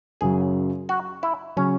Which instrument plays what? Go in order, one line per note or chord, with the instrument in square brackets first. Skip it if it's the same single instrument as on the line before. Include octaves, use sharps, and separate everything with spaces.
[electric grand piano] F#2 C#3 F#3 [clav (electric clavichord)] G#4
[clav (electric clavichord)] F#4
E4
[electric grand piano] C#3 F#3 [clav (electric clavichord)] C#4